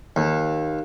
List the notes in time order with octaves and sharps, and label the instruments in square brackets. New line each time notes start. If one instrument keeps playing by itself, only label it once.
[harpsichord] D#2